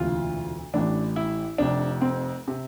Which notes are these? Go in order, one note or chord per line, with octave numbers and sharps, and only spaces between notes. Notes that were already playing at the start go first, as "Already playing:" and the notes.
Already playing: E1 D2 C3 E3 F4
A1 A2 E3 D4
E4
F1 F2 C3 D4
C4
C3